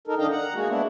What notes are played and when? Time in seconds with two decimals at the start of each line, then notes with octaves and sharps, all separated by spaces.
0.07 D#4 A4 A#4
0.19 D#3 D4 D#5 F5 G5
0.32 F#5 A#5
0.54 G#3 A#3 F#4
0.69 B3 D4 E4